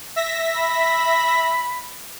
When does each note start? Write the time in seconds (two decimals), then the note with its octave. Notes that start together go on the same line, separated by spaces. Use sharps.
0.16 E5 A#6 B6
0.56 B5